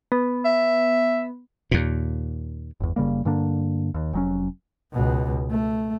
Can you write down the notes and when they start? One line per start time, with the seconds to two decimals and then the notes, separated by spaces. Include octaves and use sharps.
0.12 B3
0.45 E5
1.71 D#2 A#2
2.80 G1 E2
2.96 F#1 C#3 G3 A#3
3.25 G2 D3 A#3 D4
3.94 D#2
4.13 F1 F#3 C#4
4.92 C#2 B2
5.50 A3